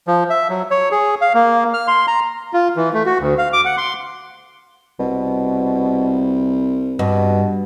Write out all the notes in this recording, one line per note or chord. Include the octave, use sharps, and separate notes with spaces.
F3
E5
F#3
C#5
G#4
F5
A#3
F6
C6
A#5
F4
E3
A3
F#4
D2
F5
D6
F#5
C6
C2 B2
G2 B2